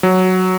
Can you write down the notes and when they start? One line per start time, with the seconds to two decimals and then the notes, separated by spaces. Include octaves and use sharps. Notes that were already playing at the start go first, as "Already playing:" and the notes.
0.03 F#3